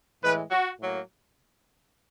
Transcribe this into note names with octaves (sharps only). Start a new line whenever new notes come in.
A2 E3 G#3 B4
F#4
A2 F#3 A#3